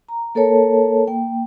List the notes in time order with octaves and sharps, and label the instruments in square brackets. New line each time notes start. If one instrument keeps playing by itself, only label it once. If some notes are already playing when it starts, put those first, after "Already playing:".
[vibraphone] A#5
A#3 A4 A#4 C#5 A5
A#3 G5